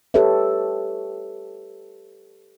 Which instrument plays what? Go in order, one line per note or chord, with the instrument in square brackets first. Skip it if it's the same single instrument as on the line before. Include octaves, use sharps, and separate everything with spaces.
[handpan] G4 A4 B4 C#5 E5